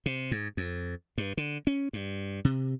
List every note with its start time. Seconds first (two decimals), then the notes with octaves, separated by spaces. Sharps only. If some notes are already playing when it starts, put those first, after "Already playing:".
0.06 C3
0.31 G#2
0.57 F2
1.18 G2
1.37 D3
1.67 C#4
1.93 G2
2.45 C3